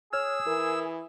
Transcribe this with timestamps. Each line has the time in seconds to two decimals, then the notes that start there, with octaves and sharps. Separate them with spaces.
0.13 G#4 C#5 E6 F6 G#6
0.47 E3 A#4